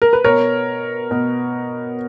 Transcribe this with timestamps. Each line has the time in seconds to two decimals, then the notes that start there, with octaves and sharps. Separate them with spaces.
0.02 A#4
0.13 B4
0.24 B2 A#4 C#5
1.11 B2